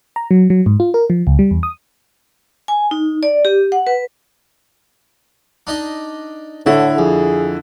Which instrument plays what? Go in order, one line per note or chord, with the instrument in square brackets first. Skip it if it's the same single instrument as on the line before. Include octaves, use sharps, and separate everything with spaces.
[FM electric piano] A#5
F#3
F#3
G#2
F4
A#4
F3
C#2
G3
E2
D#6
[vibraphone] G#5
D#4
D5
G4
F#5
B4
[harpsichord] D4 D#4 D#5
[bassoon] A2 [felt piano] D3 E4 [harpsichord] F#4
[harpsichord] F2 [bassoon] G#4